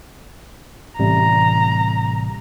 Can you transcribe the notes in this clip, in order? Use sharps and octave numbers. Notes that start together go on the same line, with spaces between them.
A1 C3 G3 A#5